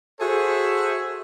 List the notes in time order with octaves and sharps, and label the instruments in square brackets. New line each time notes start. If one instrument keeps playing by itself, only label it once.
[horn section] F#4 G#4 A4 C5 E5